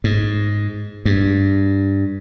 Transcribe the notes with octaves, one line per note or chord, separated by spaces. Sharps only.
G#2
G2